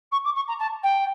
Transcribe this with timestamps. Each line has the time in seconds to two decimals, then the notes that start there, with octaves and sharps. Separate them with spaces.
0.12 C#6
0.24 D6
0.35 C#6
0.48 A#5
0.59 A5
0.83 G5